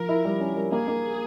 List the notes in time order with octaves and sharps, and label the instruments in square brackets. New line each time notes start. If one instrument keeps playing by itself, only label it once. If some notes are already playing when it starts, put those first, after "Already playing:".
Already playing: [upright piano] F3 [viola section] A#4
[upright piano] E4
G3
C#4
G3
[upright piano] A#3 [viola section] G#4
[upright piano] A#3